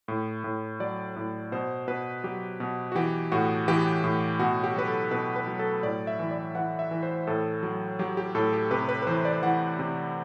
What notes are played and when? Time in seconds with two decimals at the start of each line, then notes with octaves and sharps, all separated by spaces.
0.08 A2
0.44 A2
0.80 F#3 D5
1.16 A2
1.52 B2 C5
1.88 B2 B4
2.24 F#3 G4
2.60 B2
2.92 F#4
2.95 E3 G4
3.32 A2 F#4
3.68 E3 G4
4.04 A2
4.39 B2 F#4
4.64 G4
4.76 F#3 B4
4.88 A4
5.11 B2 B4
5.36 B4
5.47 F#3
5.59 A4
5.83 A2 D5
6.07 E5
6.19 E3
6.31 D5
6.55 E3 F#5
6.79 E5
6.91 E3
7.03 C5
7.27 A2 A4
7.63 F#3
7.99 F#3 G4
8.17 G4
8.35 A2 A4
8.53 G4
8.71 C3 B4
8.89 B4
9.02 B4
9.07 E3 C5
9.25 D5
9.42 E3 F#5
9.79 C3